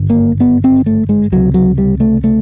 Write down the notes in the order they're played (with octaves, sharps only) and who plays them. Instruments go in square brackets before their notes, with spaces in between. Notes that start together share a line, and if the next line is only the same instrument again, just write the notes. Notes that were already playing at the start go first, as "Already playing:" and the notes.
Already playing: [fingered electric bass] G#1 G2 D3
A#3
B3
C4
A3
G#3
C#2 C3 F#3
F#3
G3
A3
A3